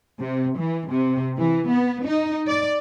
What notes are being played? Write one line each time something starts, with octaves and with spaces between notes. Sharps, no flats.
C3
E3
C3
E3
B3
D#4
D5